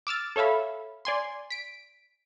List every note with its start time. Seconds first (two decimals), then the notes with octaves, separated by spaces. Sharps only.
0.07 D6 E6 F6 A6
0.36 A4 C#5 E5 F5 B5
1.05 D5 G#5 C6
1.51 B6 D7